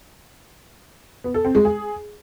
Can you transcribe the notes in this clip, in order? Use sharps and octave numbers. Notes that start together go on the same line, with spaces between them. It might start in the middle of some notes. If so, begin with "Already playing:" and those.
B3
A4
C4
G#3
G#4